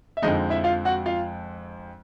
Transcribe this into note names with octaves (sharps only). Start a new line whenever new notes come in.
E5
F2 D3 F3 G#3 D#4 D#5
E4 E5
F4 F5
F#4 F#5
F4 F5